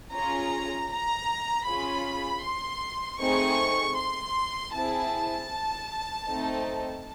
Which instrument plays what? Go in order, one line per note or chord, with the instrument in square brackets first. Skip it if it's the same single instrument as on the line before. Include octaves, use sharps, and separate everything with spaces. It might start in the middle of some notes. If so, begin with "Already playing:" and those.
[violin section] C#4 F4 G#4 A#5
A#5
C#4 F4 G#4 B5
C6
A3 C4 D#4 G#4 C#6
C6
C4 E4 G#4 A5
A3 C4 D#4